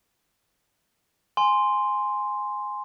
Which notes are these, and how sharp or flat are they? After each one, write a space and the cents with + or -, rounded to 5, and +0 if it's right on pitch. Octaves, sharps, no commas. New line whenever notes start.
G#5 +0 C6 +0